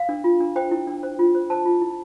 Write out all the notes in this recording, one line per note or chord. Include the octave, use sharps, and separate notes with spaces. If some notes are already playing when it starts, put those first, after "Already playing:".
Already playing: F5
D4
F4
D4
C5 G5
E4
D4
C5
F4
C5
C5 A5
F4
E4